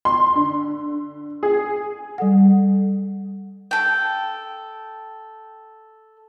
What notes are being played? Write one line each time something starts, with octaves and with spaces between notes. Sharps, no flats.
C6
D3
G#4
G3 A4 F#5
A4 G5